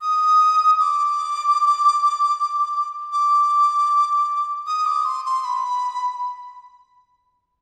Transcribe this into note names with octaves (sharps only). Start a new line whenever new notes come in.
D#6
D6
D6
D#6
D6
C6
C6
B5